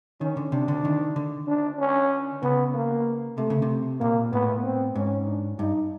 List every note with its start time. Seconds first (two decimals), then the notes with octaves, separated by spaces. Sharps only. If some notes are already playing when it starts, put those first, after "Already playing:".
0.21 D#3 C#4
0.37 D3
0.52 C3 D4
0.68 D3
0.85 D#3
1.16 D3
1.47 D4
1.79 C#4
2.42 C#3 B3
2.74 A#3
3.38 C3 A3
3.50 C#3
3.62 C3
4.00 A#2 A#3
4.32 A2 B3
4.64 C4
4.95 G#2 C#4
5.28 D4
5.59 G2 D#4